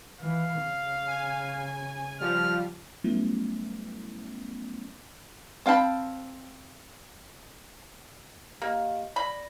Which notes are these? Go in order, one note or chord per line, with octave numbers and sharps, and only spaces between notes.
E3 F5
C#3
G#5
F3 G3 F6
F#3 G3 A3 B3 C#4 E4
C4 F5 G5 A5 B5
A#3 G4 D#5 F5
D5 B5 A#6